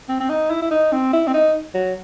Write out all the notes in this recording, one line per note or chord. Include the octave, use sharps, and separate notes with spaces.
C4
C4
D#4
E4
E4
D#4
C4
E4
C4
D#4
F#3